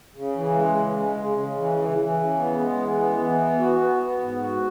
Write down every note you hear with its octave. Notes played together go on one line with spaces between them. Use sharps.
C#3
E3
G#3
C#3
G#3
C#3
C#3
E3
E3
E3
C#3
B3
G#3
E3
B3
E3
B3
F#4
B3
B3
G#2
F#4